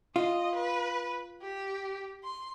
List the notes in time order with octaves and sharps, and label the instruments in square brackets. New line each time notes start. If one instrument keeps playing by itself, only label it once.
[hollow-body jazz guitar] F4 [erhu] D#5
[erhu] B4
G4
C6